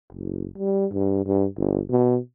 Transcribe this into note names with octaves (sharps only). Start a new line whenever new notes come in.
F#1
G3
G2
G2
G1
B2